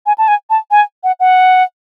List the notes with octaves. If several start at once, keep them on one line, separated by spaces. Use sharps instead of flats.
G#5
A5
G#5
A5
G#5
F#5
F#5